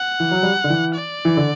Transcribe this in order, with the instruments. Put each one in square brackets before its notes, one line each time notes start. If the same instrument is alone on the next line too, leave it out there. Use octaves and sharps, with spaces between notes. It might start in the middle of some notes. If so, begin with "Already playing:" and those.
Already playing: [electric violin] F#5
[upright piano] E3
F#3
G3
D3
E3
[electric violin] D5
[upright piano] E3
D3